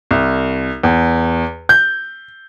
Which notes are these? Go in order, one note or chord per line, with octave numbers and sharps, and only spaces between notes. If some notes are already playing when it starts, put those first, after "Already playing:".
C2
E2
G6